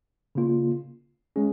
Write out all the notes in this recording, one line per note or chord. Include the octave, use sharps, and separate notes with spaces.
C#3 A#3 F4
G#3 C#4 G#4